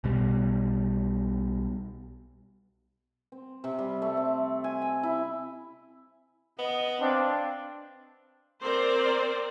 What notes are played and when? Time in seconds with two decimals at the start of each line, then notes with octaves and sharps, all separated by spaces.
0.04 B1 B2 G3
3.32 C4
3.64 C3
3.79 G3
4.02 A3
4.17 C4
4.64 G#5
4.82 G5
5.03 E4
6.59 B3 D#5
7.00 C4 D4 F5
8.61 C4 A#4 C5 D5